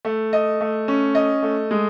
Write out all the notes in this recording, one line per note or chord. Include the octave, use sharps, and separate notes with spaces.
A3
D#5
A3
C#4
D#5
A3
G#3